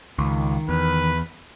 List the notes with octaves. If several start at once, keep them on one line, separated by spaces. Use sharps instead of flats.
C#2 D#3
E2 B4